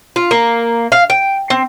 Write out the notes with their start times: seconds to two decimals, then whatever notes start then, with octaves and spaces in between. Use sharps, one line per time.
0.16 F4
0.31 A#3
0.92 F5
1.10 G5
1.50 C4